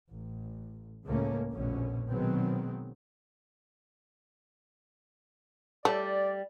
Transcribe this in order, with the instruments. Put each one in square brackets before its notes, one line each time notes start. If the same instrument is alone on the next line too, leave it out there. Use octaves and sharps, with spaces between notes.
[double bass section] A1
C#2 A2 A3 A#3 C#4
F1 A#1 B2 D3 C#4
B2 D#3 F#3 G#3 B3 C4
[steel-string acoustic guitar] G3 [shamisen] A3 [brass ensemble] D5